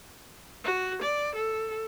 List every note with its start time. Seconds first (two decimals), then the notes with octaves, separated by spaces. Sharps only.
0.64 F#4
1.02 D5
1.35 A4